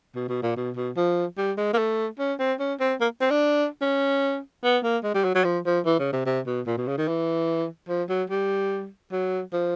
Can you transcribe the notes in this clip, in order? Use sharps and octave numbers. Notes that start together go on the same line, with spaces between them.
B2
B2
A#2
B2
B2
F3
G3
G#3
A#3
A3
C#4
C4
C#4
C4
A#3
C4
D4
C#4
B3
A#3
G#3
G3
F#3
F#3
F3
F3
E3
C#3
C3
C3
B2
A#2
B2
C#3
D#3
E3
F3
F#3
G3
F#3
F3